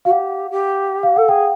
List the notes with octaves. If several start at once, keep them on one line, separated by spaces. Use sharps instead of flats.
F#4 F5
G4 F#5
G4
F5
A4 F#5
G#4 G5